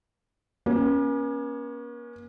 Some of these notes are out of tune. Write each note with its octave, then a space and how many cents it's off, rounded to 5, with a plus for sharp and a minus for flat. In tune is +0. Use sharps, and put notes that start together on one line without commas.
A#3 +45 C#4 +0